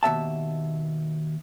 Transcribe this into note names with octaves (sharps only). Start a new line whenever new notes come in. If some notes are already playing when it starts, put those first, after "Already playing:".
D#2 B2 E5 A5